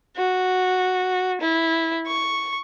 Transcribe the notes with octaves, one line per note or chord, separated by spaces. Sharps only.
F#4
E4
C#6